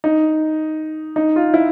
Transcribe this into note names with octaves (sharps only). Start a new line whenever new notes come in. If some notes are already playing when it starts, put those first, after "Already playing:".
D#4
D#4
F4
E4